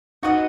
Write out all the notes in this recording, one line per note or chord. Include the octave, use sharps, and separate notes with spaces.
D#4 F#4 B4 D#5 F#5